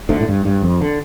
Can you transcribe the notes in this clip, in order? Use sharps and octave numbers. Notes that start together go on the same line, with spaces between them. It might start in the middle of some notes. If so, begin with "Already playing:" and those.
D2 D3
A2
G2
G2
F2
D3